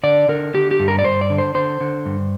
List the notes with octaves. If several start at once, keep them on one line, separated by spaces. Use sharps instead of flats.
D3 D5
D3 A#4
D3 G4
G4
G2
A#4
D5
G2 C5
D5
D3
C5
D3 C5
D3
G2